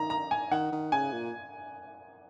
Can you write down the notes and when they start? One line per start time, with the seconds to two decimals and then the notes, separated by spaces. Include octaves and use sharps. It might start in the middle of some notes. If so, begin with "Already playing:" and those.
Already playing: D#3 A#5
0.10 A#5
0.31 G#5
0.51 D#3 F#5
0.72 D#3
0.92 C#3 G#5
1.13 A#2